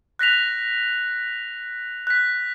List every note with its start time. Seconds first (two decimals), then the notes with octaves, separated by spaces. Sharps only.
0.19 F#6 A#6 B6 F7
2.07 F#6 B6